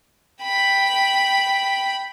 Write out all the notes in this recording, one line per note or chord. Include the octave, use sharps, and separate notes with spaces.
G5 B5